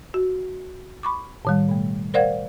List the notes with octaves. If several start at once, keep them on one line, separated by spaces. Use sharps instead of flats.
F#4
B5 C#6 D6
A2 D#3 G3
B2 A3
A#4 C5 D5 F5 F#5 G#6